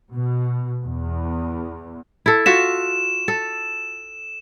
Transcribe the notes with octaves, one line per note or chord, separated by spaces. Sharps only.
B2
E2
E4 A4
F4 F#4 E5 E7
A4